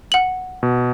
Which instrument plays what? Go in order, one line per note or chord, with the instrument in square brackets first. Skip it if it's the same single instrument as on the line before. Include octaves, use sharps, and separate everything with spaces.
[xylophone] F#5 F#7
[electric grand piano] B2